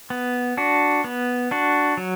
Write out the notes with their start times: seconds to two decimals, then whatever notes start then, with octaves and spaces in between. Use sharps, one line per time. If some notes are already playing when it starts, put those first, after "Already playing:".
0.10 B3
0.57 D4 F#4
1.04 B3
1.51 D4 F#4
1.97 F#3